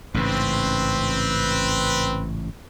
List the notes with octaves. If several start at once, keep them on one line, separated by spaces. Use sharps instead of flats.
A1 G#2 C#3 C4 B4